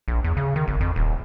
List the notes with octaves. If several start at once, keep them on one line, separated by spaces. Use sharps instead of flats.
A#1
E2
C#3
D#3
G#1
F2
D#1